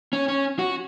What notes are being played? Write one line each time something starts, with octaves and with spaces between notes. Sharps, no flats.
C#4
C#4
F#4